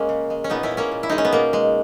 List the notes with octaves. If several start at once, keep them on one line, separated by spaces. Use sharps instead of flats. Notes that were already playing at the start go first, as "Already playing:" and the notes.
Already playing: G#3 A#3 C#4
C#3
G#3
C#4
A#2 B3 D#4
C#4 E4
G#3
A#3 C#4
A#2
E4
G#3 D#4
C#4
B3
B2 A#3
G#3